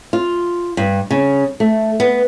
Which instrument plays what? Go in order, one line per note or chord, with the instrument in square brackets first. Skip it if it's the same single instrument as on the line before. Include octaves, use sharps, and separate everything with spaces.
[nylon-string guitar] F4
G2
C#3
A3
B3